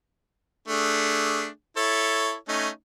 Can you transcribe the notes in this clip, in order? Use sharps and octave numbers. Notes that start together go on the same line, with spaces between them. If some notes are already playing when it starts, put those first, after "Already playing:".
A3 D4 G#4
E4 A4 C#5
A3 C#4 D#4